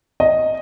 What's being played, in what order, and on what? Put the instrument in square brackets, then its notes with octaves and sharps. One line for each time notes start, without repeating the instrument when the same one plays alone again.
[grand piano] D#5